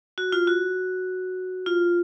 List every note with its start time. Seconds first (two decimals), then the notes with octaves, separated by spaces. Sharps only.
0.18 F#4
0.32 F4
0.47 F#4
1.66 F4